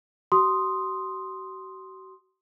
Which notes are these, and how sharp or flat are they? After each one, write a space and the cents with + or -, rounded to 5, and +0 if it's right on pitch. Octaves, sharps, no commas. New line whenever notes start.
F#4 +40 C6 +0 D#6 +0